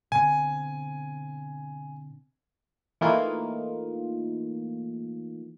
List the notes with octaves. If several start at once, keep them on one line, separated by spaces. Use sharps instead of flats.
B2 D3 C4 G#5
E3 A3 A#3 D#4 F4